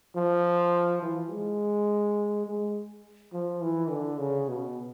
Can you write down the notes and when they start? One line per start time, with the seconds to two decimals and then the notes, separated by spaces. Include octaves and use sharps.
0.16 F3
1.02 E3
1.30 G#3
2.47 G#3
3.33 F3
3.61 E3
3.90 D3
4.19 C#3
4.49 B2